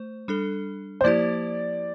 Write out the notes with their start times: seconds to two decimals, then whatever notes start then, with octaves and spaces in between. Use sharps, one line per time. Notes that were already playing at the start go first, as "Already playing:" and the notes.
Already playing: A3 C5
0.28 G3 D4 A4
1.01 C5
1.04 F3 A#3 E4 G4 D5